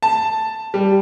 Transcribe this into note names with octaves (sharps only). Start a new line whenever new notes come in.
A5
G3